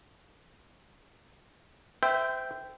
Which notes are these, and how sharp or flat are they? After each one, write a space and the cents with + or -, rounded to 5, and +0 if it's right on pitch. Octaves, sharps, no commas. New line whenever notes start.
C5 -30 E5 +0 G5 +0